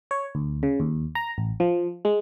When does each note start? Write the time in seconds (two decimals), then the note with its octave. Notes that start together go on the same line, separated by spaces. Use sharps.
0.11 C#5
0.35 D2
0.63 C#3
0.80 D#2
1.15 A#5
1.38 A1
1.60 F3
2.05 G#3